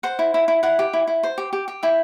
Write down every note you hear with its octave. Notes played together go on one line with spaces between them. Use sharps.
C5 F#5
E4
E4
E4
E4 F#5
G4
E4
E4
C5
G4
G4
G4
E4 G5